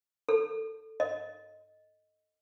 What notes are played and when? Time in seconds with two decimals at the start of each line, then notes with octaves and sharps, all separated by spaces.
0.29 A4
1.00 D#5